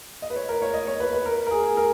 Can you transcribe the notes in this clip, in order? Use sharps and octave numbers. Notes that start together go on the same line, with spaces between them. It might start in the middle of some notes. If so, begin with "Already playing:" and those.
D#5
B4
C#5
A#4
C#5
D#5
C#5
B4
B4
A#4
A#4
G#4
G#4
A#4